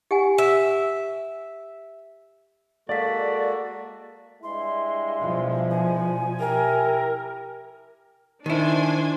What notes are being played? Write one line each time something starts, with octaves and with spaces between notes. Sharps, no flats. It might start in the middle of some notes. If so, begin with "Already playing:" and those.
G4 F#5 G#5
E5
G#3 A#3 F#4 A4 D5 F5 B6
G2 G#3 E4 C6
B2 F3
G#5
E4 G4 A#4
D#3 D4 E4 C5 G#5